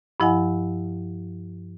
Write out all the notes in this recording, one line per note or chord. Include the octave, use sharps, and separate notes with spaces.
G2 F3 E4 D#5 F#5 G#5